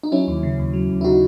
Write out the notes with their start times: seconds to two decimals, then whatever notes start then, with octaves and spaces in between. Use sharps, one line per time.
0.03 D#4
0.12 F#3 C#4 E4
0.28 D#2
0.43 C#3
0.58 D#2
0.73 F#3
0.90 D#2
1.01 E4
1.04 C#3 D#4 F#4